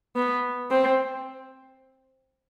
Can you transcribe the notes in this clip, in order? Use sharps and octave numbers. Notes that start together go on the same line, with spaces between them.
B3
C4